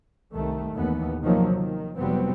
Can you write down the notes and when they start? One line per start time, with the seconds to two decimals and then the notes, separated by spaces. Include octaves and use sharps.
0.34 C2 D#3 A3
0.74 D#2 A2 E3 B3
1.23 C3 D#3 F3 F#3 A#3
1.53 D#3
1.98 F1 F#3 G3 B3 C4